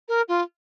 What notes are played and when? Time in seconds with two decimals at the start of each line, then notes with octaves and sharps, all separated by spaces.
0.08 A#4
0.28 F4